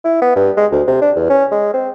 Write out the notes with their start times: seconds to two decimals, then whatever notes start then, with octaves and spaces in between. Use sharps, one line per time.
0.05 E4
0.22 B3
0.36 G2
0.57 G#3
0.72 D2
0.87 C3
1.02 D4
1.16 E2
1.30 C#4
1.52 G#3
1.74 C4